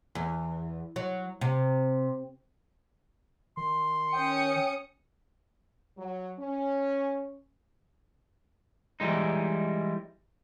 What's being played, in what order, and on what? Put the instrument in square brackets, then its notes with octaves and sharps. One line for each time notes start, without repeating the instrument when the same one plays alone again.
[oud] E2
F#3
C3
[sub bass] D#3 [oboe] C6
[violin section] C#4 D#6 C#7 [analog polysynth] G5
[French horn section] F#3
C#4
[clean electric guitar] E3 G3 G#3 D#4